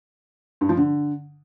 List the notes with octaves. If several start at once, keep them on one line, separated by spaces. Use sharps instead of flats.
G2
F3
D3